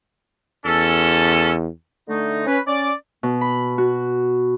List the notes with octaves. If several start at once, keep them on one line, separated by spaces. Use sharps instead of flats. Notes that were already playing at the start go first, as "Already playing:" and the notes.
E2 C#4 A4
D3 A3 D#4
C#4 B4
C#4 D5
B2
B5
F#4